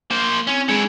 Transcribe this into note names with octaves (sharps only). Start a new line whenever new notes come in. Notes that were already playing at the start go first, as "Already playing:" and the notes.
A#3 C5
C4 C#4 E4
D3 G#3 E4 G#4